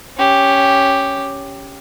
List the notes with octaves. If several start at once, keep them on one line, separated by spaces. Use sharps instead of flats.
C#4 G4